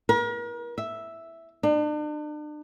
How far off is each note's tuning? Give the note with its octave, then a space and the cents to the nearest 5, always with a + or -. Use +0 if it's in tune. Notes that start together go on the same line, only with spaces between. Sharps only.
A#4 +40
E5 +0
D4 +40